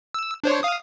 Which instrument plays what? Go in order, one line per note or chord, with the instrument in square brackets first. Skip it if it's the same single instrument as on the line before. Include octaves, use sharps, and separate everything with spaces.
[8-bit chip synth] E6
D4 C5 C#5
F5 D#6